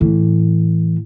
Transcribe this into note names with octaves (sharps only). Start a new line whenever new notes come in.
A2 E3